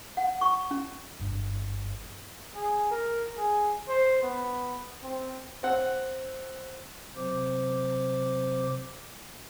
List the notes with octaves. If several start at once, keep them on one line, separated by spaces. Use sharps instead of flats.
F#5
C#6
C#4
G1 G2
G#4
A#4
G#4
C5
B3
C4
C4 F#5
C3 F#3 C4 C5 D6